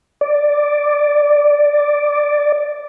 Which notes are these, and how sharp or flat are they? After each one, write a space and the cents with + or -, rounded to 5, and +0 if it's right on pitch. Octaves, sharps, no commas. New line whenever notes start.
D5 +0